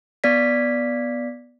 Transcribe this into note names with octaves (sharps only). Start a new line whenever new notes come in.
B3 D5 B6